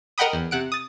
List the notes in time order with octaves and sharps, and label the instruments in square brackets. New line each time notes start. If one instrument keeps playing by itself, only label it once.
[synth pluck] A#4 D#5 F#5 G5 B5 D#6
E2
C3 F#5 D7
D#6 A6